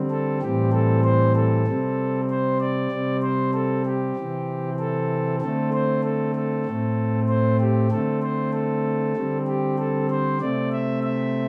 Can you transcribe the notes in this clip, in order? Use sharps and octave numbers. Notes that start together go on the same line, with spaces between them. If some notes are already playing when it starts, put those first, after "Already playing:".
Already playing: D3 G3 C4
A4
A2 E3 G3 C4 G4
A4
C5
A4
C3 G3 C4
C5
D5
C3 G3 C4
C5
A4
G4
C3 E3 C4
A4
D3 A3 C4 A4
C5
A4
A4
A2 A3 C4
C5
G4
D3 A3 C4 A4
C5
A4
D3 G3 C4
G4
A4
C5
C3 A3 C4 D5
E5
E5